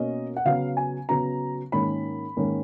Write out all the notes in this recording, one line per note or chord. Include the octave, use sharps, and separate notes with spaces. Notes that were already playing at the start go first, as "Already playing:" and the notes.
Already playing: B2 A#3 C#4 D#5
F#5
C#3 F#3 B3 F5
G#5
C#3 F#3 B3 A#5
G#2 D#3 A#3 C#4 B5
G#2 D#3 A#3 C#4